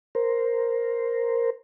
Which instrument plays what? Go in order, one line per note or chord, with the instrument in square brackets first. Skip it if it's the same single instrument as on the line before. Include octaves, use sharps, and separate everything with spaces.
[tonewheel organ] A#4 C5